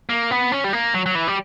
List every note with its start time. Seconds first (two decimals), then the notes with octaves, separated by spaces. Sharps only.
0.09 A#3
0.31 B3
0.52 C#4
0.64 G3
0.73 A#3
0.94 F#3
1.06 F#3
1.15 E3
1.28 G3